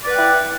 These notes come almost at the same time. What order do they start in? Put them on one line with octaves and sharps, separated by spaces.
D5 B4 F#5 G5 E4